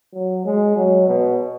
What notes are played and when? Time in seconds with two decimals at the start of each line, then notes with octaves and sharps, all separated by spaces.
0.14 F#3
0.45 G#3
0.76 F#3
1.07 B2